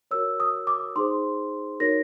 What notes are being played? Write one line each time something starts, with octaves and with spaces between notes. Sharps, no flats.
F#4 A#4 C#5 E6
D#6
D6
D#4 G#4 C5 C6
D#4 F#4 A#4 C#5 A#6